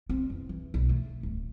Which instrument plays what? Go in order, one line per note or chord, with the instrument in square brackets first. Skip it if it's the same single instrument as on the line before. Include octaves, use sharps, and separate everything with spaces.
[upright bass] C4
E2
E3
B1
A3
D1